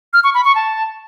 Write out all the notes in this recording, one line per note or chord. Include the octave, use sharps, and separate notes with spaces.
F6
C#6
B5
C#6
A5